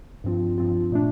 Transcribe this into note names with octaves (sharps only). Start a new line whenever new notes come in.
G2 F3 C4 F4
G2 F3 C4 F4
A#2 A3 D4